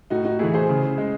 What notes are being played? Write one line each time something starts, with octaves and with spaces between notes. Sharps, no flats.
A2 D#4 F#4
D#4 F#4
E3 A3 E4 G#4
G#4 C5
C#3
G#3